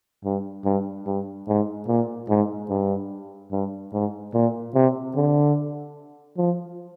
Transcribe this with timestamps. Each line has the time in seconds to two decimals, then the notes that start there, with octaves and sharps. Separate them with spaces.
0.25 G2
0.65 G2
1.07 G2
1.48 G#2
1.88 A#2
2.29 G#2
2.69 G2
3.52 G2
3.93 G#2
4.34 A#2
4.75 C3
5.16 D3
6.38 F3